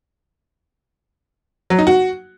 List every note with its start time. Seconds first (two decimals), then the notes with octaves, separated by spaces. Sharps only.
1.70 F#3
1.79 D#4
1.87 F#4